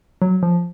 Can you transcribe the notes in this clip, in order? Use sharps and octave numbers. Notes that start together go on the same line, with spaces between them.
F#3
F3